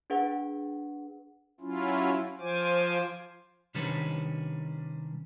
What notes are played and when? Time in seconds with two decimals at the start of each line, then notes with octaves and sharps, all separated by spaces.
0.10 D4 G#4 B4 F#5
1.60 F#3 C#4 E4 F4
2.39 F3 F4 C5 G#5 D6
3.75 C3 D#3 G3 C#4 D4 B4